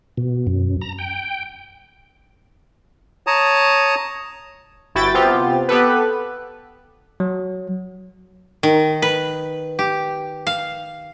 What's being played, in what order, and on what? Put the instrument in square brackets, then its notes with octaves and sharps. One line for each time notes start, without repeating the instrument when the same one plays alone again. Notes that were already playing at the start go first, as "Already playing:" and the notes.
[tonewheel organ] B2
F#2
A#5
G5
[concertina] C#5 A5 A#5 D#6
[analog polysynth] G1 E4 F#4 G5 A6
C3 B3 C4 F4 G4
B3 G4 A4 B4
[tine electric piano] F#3
[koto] D#3
B4
G4
F5